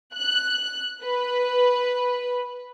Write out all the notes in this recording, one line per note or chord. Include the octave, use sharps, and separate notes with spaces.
F#6
B4